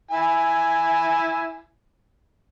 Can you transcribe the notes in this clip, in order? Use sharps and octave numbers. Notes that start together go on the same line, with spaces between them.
E4 G#5